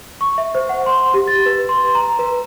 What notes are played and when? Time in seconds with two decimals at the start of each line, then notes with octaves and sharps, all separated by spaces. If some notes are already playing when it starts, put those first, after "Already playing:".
0.21 C#6
0.38 E5
0.55 C5
0.69 F#5
0.86 C6
1.14 G4
1.27 A6
1.46 B4
1.69 C6
1.95 A#5
2.19 B4